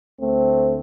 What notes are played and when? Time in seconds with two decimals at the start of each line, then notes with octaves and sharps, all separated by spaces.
0.20 D2 A3 C4